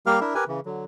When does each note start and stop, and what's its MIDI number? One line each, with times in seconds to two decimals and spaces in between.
0.06 0.20 55
0.06 0.20 58
0.06 0.20 67
0.06 0.20 70
0.06 0.20 77
0.06 0.20 89
0.21 0.34 62
0.21 0.34 64
0.21 0.34 70
0.21 0.34 76
0.35 0.44 67
0.35 0.44 70
0.35 0.44 71
0.35 0.44 80
0.48 0.60 49
0.48 0.60 52
0.66 0.85 50
0.66 0.85 54